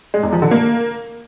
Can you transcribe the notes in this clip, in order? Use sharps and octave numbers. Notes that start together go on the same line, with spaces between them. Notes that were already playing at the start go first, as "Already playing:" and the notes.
G#3
E2
F3
D3
A#3